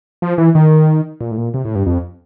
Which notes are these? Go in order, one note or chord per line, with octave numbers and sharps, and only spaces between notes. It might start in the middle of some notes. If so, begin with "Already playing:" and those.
F3
E3
D#3
A#2
A2
A#2
C3
A2
G2
F2